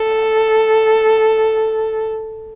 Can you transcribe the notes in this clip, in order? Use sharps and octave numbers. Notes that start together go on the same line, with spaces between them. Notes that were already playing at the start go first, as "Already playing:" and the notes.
Already playing: A4